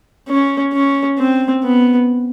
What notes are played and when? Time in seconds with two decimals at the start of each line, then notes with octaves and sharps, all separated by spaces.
0.28 C#4
0.73 C#4
1.19 C4
1.64 B3